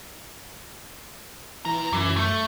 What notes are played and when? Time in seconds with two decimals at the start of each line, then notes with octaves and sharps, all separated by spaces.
1.65 A#2 E3 A#5
1.93 F#2 E3
2.16 A3